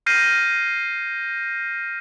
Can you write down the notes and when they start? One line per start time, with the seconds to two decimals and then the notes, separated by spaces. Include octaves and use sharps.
0.06 F6 G6 A#6 C7 D#7